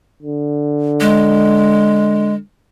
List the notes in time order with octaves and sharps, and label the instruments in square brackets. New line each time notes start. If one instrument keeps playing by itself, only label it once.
[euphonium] D3
[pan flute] G#3